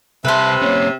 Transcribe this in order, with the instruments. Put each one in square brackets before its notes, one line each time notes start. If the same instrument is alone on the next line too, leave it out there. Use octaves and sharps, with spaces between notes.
[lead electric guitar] C2 A5 [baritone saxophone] C3 [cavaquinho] B4 C5 [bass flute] E5
[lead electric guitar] A#3 C#4 [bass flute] C#5